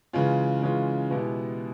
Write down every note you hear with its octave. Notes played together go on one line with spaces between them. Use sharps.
C#3 E3 G#3 C#4 F4
C#3 E3 G#3 C#4 F4
B2 G#3 B3 E4 G4